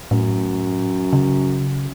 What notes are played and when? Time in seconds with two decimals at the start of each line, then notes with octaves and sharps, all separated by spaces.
0.11 F#2 A2
1.13 C#3